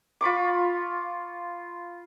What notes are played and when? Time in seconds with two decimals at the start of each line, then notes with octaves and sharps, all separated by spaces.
0.21 F4 B5 C#6 D6